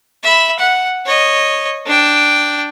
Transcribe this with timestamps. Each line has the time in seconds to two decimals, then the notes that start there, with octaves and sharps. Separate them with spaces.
0.23 E5 B5
0.59 F#5
1.06 C#5 D#5
1.86 D4 G5